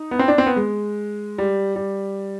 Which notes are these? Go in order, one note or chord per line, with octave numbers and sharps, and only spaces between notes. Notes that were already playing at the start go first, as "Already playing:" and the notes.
Already playing: D#4
B3
C4
D4
C4
B3
G#3
G3
G3